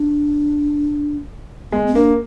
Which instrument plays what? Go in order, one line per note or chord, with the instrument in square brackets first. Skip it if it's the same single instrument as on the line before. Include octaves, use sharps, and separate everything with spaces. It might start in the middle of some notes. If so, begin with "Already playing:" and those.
Already playing: [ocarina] D4
[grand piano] G#3 [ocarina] B3
[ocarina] B3
[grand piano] A#3 [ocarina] D4